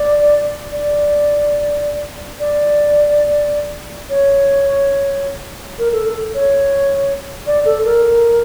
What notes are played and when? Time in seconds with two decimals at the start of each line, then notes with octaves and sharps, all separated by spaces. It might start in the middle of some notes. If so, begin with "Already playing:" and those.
Already playing: D5
0.72 D5
2.40 D5
4.10 C#5
5.79 A#4
5.93 A4
6.06 A4
6.35 C#5
7.47 D5
7.65 A4
7.85 A#4